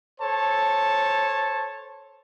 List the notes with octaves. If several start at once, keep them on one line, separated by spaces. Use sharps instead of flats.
A4 C5 C#5 A5